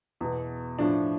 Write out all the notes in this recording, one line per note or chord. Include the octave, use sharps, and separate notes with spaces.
E2 B2
A2 F3 D4